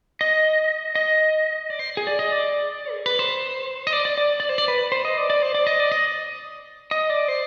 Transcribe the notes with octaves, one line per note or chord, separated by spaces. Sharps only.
D#5
D#5
D5
C5
G#4
D5
D#5
D5
G#4
B4
C5
D#5
D5
D5
D5
D5
C5
D5
B4
C5
D#5
D5
D5
C5
D5
D#5
D5
D#5
D#5
D5
C5